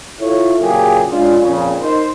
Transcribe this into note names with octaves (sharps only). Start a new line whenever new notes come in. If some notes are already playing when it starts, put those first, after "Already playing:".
E4 F4 A4 C#5
A#2 C#3 F#3 A#3 G4 G#4
G#3 C#4 D4 F4
F2 A#2 C#3
D#4 A#4 C5